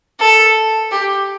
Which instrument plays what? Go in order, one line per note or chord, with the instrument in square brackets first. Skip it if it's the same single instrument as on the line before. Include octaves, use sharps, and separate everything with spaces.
[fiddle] A4
G4